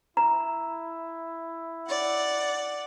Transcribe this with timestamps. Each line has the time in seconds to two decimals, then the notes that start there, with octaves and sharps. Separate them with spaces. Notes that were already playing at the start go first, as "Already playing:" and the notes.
0.17 E4 A#5
1.87 D5 F#5